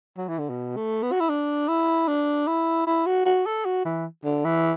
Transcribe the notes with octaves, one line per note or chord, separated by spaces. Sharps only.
F#3
E3
D3
B2
A3
B3
F#4
E4
D4
E4
D4
E4
E4
F#4
F#4
A4
F#4
E3
D3
E3